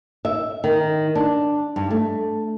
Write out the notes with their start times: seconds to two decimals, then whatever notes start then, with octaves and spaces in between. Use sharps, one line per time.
0.25 E5
0.64 D#3
1.15 D4
1.76 G2
1.91 A3